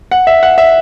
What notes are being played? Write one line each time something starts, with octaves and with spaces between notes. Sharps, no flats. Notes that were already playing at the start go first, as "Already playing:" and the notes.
F#5
E5
F#5
E5